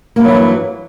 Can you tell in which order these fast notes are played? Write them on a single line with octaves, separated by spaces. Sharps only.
A#3 G2 F#3 E3